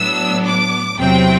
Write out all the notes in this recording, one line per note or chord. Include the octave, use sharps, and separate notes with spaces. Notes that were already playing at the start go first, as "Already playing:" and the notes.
Already playing: A2 F#3 B3 D4 E6
D6
E2 C3 F#3 C4 G5